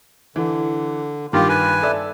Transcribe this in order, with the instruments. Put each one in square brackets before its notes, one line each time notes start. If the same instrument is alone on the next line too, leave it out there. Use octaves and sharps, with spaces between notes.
[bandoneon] D3 [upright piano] E3
[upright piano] G2 D#3 [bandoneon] F4 G4
[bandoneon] B4 G#5
[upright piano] A4 D5 E5